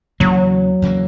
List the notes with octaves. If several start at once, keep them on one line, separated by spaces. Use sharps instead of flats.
E2 C#3 E3 F#3 A#3
E2 C#3 E3 A#3